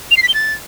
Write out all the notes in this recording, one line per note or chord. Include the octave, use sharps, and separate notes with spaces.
F7
C7
B6
G7
A6